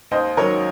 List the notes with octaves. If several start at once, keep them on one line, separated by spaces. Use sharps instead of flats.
D#2 C5 D#5
D#3 F#3 A#4 C#5